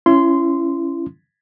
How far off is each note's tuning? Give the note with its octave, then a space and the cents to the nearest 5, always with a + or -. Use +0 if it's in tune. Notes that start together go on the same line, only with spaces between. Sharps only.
C#4 +0 E4 +30 C6 -15